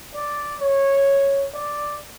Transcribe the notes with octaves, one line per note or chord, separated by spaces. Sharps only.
D5
C#5
D5